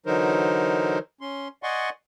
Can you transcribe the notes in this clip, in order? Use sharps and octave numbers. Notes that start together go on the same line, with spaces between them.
D3 E3 F#3 D#4 A#4 C5
C#4 C6
D5 D#5 F#5 G#5 C6 C#6